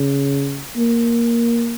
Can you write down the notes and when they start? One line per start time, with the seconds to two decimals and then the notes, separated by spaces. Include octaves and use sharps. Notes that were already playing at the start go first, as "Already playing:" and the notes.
Already playing: C#3
0.76 A#3